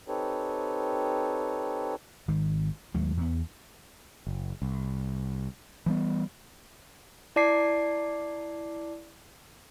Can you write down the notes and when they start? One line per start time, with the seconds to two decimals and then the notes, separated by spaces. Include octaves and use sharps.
0.08 C4 D#4 G4 A4 B4 C#5
2.28 G#1 D#3 G#3
2.94 D#2 F#3 G#3 A3
3.17 E2 B3
4.27 F#1
4.62 C2
5.86 E3 G3 B3
7.36 E4 D5 A5 D6 C7